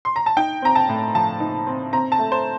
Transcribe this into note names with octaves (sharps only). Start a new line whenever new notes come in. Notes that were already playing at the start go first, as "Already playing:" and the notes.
C6
A#5
A5
D#4 G5
C4 A#5
A5
A2
F3 A5
D#4
C4
C4 A#5
A5
A3
C5